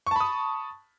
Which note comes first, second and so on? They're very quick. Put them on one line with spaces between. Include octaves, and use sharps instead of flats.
C#6 A5 B5 D#6